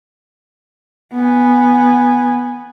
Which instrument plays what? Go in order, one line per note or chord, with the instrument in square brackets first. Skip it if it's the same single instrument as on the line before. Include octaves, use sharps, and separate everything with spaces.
[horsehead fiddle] B3 G#5